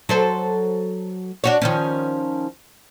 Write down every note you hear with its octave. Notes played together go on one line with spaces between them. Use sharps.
F#3 A4 C5
D4 F#4 C#5
D#3 F3 C#4